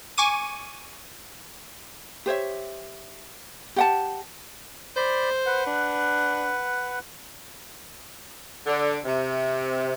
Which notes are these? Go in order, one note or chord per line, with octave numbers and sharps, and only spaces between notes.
G#5 C#6 D6 D#7
G4 C5 C#5 E5
G4 F#5 A5
C5 D5 B5
B4 F#5
D4
D3
C3